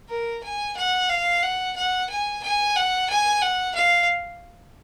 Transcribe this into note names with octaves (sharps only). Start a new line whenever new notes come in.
A#4
G#5
F#5
F5
F#5
F#5
G#5
G#5
F#5
G#5
F#5
F5